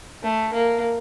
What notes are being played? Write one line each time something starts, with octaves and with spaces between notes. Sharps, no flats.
A3
A#3